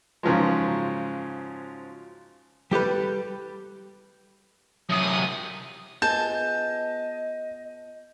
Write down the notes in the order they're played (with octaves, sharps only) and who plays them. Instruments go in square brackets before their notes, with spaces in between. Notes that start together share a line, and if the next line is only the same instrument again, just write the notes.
[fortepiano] G#2 C#3 F3 F#3 G#3
[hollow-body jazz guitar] G3 G4 A4 B4
[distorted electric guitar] F#2 C3 [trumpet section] D#6
[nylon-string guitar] B3 F4 G#4 [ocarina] D#5 [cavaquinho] A5 [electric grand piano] G6